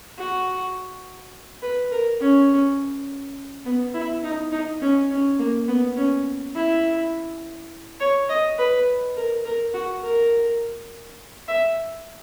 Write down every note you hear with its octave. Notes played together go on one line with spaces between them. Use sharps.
F#4
B4
A#4
C#4
B3
E4
D#4
D#4
C#4
C#4
A#3
B3
C#4
E4
C#5
D#5
B4
A#4
A#4
F#4
A#4
E5